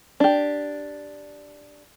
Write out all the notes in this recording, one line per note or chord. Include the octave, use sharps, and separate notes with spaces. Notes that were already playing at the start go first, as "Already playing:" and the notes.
D4 G4